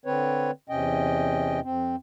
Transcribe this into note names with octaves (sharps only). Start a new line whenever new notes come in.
D3 C4 B4 C#5
E2 C3 C#4 D#5 G5
F2 C4